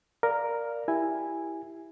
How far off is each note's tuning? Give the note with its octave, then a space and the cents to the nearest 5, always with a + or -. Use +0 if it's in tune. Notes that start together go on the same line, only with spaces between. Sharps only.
A#4 +0 D5 +0 F5 -10
E4 +0 G4 +0 G#5 -5